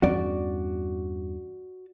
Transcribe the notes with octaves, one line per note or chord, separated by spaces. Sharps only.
E2 G2 C#4 F#4 D5